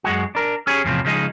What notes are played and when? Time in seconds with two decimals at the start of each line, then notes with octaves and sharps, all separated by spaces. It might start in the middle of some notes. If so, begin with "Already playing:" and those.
0.04 F#2 G#3 F#4
0.35 D4 A#4
0.67 C#4 G4 G#4 C#5
0.84 E2 A2 C3 F3
1.05 C#3 F3 G#3 D#4